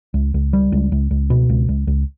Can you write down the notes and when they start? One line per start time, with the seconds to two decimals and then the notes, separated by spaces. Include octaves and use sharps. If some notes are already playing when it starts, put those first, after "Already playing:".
0.14 C#2
0.34 C#2
0.53 G3
0.72 C#2
0.92 C#2
1.11 C#2
1.30 B2
1.49 C#2
1.69 C#2
1.87 C#2